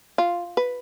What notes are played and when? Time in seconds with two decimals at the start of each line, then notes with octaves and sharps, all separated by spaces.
0.18 F4
0.57 B4